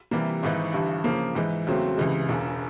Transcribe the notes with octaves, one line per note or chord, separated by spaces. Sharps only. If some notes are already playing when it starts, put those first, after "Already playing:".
C3 E3 G3 A#3
G#1 G#2 E3
G1 G2 E3
C#3 F3 A#3
G#2 E3 G#3
E2 C#3 F#3 A3 C4
C#2 C3 E3 G#3
E1 E2 C#3